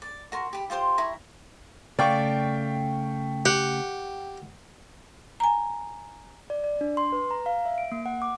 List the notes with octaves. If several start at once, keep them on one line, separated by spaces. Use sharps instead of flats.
D5
F#4 A#4 C6
G4 B5
F4 G4 C5 C6
E4 A#5 C#6
C#3 A3 D5 F5 G5 C#6
G4 F#5
G#5 A#5
D5
D5
D4
C6
B4
A#5
F5
E5
D7
A#3
F#5
D6